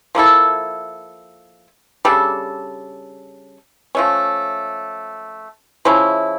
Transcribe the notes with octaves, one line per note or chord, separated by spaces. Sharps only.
F3 A#3 E4 A4
C#3 G3 D4 A4
F3 A3 C#4
C#3 F3 C#4 E4